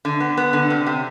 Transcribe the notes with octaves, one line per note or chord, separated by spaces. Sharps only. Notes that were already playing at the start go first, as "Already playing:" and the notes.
D3
B3
B3
D3
C3
C3